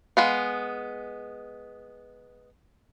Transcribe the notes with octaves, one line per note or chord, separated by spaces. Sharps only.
G#3 B3 F5